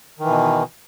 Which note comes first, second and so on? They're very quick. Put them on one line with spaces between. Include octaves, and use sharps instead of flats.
D#3 E3 B2